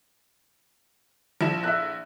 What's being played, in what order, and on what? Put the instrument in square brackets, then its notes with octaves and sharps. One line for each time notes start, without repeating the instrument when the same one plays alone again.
[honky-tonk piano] A#1 E4 E7 [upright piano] F3
[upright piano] E5 E6 F#6